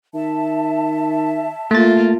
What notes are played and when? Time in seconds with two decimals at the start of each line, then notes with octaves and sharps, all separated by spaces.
0.14 D#3 E5 A5
1.71 A3 A#3 F4 A6